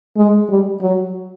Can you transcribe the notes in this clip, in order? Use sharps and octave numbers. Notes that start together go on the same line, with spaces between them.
G#3
G3
F#3